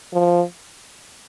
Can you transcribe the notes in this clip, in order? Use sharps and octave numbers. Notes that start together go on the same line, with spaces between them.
F3